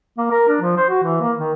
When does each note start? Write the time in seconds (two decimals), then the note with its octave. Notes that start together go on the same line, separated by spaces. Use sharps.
0.18 A#3
0.31 A#4
0.48 D4
0.61 F3
0.77 C5
0.89 F#4
1.03 E3
1.21 A#3
1.38 D#3